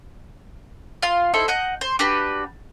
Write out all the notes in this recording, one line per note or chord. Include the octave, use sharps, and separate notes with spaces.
F4 F5 C6
D#4 E4 A4 C5
D#5 F#5 G6
C5
D4 F#4 G4 B4